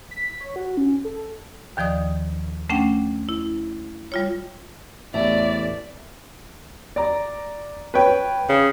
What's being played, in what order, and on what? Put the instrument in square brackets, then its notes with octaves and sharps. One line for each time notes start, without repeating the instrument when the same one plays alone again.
[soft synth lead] B6
C#5
F#4
C#4
A4
[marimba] D#2 D#3 F3 D5 D#6
A3 C#4 D4 F#5 G5
E4
G3 F4 C#5
[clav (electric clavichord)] A1 E2 [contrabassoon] A2 [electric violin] D5 [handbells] E5 A5
[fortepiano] D5 A#5
B4 C#5 G5
[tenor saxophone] C#3